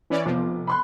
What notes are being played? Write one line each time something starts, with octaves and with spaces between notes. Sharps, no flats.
E3 C#4 D5
F1 F3 B3 D6
B5 C6 F#6